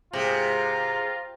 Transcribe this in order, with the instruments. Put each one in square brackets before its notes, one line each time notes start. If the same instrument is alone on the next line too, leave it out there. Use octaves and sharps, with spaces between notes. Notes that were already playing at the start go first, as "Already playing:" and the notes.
[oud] G#2 G#3 G#4 [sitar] C3 [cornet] F4 [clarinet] A#5